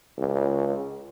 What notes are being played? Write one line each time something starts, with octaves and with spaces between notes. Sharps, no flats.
C#2